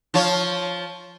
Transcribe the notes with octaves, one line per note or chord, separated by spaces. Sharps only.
F3 F4 C#5